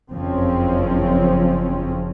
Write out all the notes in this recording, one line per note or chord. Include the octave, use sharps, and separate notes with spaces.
F#1 F2 F3 C4 C#4